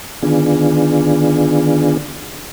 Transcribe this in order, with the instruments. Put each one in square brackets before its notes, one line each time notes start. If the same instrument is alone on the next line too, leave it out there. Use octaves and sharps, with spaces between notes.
[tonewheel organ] D3 D#3 B3 D4 F4 G#4